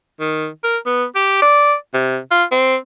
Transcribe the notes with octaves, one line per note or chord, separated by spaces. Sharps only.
D#3
A#4
B3
G4
D5
C3
F4
C4